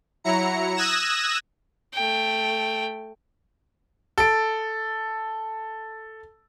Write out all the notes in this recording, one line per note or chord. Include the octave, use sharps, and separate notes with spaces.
F#3 E4 A#5 C#7
D#6 E6 F#6 G#6 A#6 E7
A3 G5
A4 D7